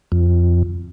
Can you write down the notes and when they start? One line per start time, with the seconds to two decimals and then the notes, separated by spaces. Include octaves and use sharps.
0.12 F2